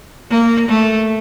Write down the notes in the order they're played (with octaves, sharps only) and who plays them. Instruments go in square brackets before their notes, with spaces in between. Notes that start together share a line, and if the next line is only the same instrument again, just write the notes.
[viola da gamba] A#3
A3